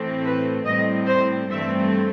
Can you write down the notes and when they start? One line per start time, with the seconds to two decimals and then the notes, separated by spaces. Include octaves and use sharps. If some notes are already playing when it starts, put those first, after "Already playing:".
Already playing: A2 E3 A3 C4
0.24 B4
0.65 A2 G3 C4 D#5
1.06 C5
1.48 G2 E3 A3 C4 E5